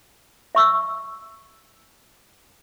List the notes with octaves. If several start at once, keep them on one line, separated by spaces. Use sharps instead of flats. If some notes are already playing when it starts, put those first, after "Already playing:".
E5 C#6 E6